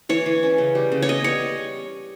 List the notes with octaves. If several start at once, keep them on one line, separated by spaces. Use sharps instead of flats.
E3 C#5
E3
C#4
C#3
G3
C#3
C#5
B3 D#5
G3 C#5